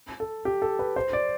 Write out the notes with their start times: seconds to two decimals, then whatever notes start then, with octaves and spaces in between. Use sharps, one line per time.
0.20 A4
0.45 G4
0.62 A4
0.79 B4
0.96 C5
1.13 D5